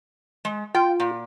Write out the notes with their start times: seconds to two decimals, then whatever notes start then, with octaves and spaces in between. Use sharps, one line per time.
0.45 G#3
0.74 F4 G5
1.00 A#2